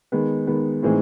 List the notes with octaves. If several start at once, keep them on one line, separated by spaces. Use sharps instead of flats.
D#3 G#3 B3
D#3 G#3 B3
A2 E3 G#3 C4 D#4